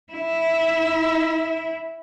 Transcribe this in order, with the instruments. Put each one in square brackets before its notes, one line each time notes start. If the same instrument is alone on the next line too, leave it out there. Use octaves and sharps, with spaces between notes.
[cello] E4